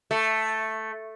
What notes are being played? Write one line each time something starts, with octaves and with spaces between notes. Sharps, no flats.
A3